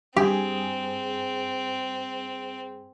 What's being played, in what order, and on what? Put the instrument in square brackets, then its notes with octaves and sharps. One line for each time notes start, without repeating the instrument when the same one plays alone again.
[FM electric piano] G2 G#4 [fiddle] C4 [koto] G4